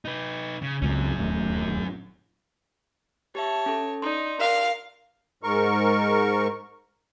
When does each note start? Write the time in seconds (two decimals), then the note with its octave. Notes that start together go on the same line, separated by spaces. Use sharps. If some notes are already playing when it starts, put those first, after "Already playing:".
0.05 D#4 B4
0.62 C#3
0.82 C#2 C#3 F#3 C4 C#4
1.18 D1 D#2 A2
3.35 G4 C#5 E5 A5
3.66 C#4 A4
4.02 D#4 D5 C6
4.41 A#4 F5
5.43 G#2 A#4 C#6